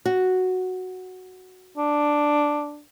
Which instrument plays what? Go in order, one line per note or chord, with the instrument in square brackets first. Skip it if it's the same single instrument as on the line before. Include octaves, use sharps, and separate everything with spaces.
[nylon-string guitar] F#4
[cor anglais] D4